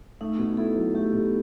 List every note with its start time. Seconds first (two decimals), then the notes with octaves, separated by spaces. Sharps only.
0.21 A3 D#4
0.38 B2
0.57 E4 A4
0.76 F#3
0.94 A3 G4
1.13 B2